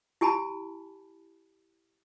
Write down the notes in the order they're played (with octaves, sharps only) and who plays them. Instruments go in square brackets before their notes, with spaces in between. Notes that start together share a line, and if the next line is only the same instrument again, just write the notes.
[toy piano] E4 G4 G#5 A5 B5